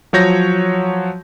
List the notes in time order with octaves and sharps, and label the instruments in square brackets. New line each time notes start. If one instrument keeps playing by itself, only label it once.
[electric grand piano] F3 F#3 C#5 G6 A#6